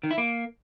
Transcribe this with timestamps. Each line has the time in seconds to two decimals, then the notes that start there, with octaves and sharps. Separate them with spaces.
0.03 D#3
0.11 E4
0.18 A#3